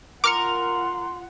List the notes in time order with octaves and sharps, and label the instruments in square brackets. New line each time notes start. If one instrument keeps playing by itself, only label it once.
[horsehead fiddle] F4 F#5 [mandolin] A#4 [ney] C6 [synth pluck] D6 F6 C#7